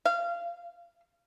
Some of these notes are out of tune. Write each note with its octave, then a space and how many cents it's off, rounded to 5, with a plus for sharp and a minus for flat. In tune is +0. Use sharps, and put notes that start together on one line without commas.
F5 -25